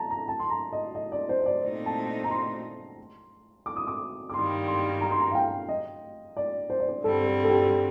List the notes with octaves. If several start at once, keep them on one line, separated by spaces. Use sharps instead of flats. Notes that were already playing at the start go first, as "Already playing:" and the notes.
Already playing: A5 A#5
A#5
A5
C6
A#5
D#5
D#5
D5
C5
C5
D5
A#2 A3 C4 D#4
A5
A#5
C6
D6
D#6
D6
D6
G2 D#3 G3 A#3 C6
C6
A#5
C6
A#5
F5
G5
D#5
D5
C5
D5
C5
G2 D3 G3 C4 A4
A4
A4
G4